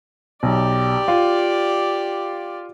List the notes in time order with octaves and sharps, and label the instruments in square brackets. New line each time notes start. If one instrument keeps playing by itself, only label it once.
[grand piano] B1 [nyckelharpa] G4 D5
[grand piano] F4 F5